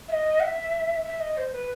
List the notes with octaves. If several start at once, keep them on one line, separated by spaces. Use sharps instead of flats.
E5
D#5
F#5
E5
E5
D#5
C5
B4